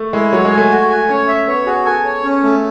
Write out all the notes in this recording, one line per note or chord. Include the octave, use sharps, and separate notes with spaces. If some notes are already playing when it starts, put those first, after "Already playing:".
Already playing: A3
G#3 E4
F#3 C#5
G#3
G#5
A3
F#4
G#5
C#4 C#5
E5
B3 C#5
F#4 G#4
A4 G#5
C#5
C#4
A3